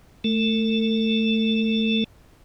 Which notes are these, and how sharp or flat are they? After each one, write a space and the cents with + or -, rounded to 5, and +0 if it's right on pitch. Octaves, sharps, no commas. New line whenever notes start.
A3 +0 A4 +45